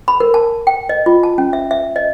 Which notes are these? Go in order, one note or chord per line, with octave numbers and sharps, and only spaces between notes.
B5
A#4
A5
G5
D#5
F4
A5
C#4
E5
E5
D#5